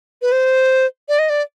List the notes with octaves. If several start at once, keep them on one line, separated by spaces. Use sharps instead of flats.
B4
C5
D5
D#5
D5